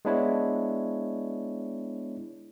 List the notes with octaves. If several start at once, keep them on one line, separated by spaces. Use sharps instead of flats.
G#3 B3 D4 E4 C#5